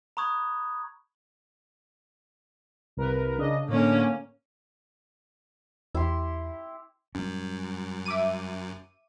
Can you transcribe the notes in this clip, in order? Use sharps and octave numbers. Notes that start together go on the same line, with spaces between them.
A#5 B5 C#6 D#6 F#6 G#6
C2 A#4 B4
C#3 D4 D#5
A2 D3 A#3 C#4
E2 E4 G4 C6
F#2 G3 C#4
E5 D6 D#7